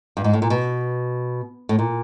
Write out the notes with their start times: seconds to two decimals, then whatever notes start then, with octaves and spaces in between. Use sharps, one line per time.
0.17 G2
0.24 G#2
0.33 A2
0.42 A#2
0.50 B2
1.69 A2
1.79 A#2